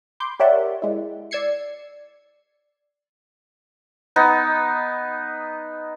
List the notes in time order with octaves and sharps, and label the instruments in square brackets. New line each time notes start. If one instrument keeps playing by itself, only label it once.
[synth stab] B5 C6 D6 G6
G4 A#4 C#5 D5 E5 F#5
G#3 E4
D5 E6 G#6 C7 C#7
[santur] B3 D#4